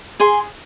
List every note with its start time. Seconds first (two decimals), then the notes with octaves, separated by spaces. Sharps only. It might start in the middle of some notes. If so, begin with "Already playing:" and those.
0.20 G#4 G#5 C6